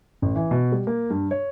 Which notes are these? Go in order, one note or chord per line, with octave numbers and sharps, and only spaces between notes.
A1
E3
B2
G3
A#3
G2
C#5